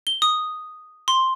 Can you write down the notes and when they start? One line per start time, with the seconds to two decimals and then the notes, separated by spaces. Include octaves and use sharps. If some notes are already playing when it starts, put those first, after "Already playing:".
0.07 G7
0.22 D#6
1.08 C6